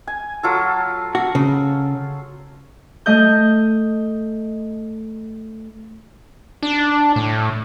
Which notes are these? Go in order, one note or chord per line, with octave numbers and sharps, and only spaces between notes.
G#5
F#3 F4 A4
F#4
C#3
A3 D#5 G6
D4
A2